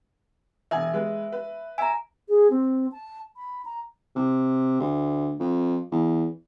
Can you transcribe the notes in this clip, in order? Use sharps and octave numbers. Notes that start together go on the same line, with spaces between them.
E1 E5 G#5
G#3 B4
B4
E5 G#5 A#5
G#4
C4
A5
B5
A#5
C3
D2
F2
E2